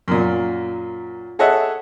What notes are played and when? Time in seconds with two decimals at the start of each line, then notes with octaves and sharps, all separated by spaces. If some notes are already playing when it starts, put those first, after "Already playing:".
0.08 F#2 A#2
1.39 G#4 A4 C#5 D#5 E5 F#5